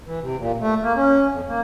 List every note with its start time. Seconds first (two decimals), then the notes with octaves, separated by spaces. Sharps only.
0.06 E3
0.22 C3
0.38 A#2
0.61 A3
0.83 A#3
0.96 C#4
1.29 F2
1.48 A#3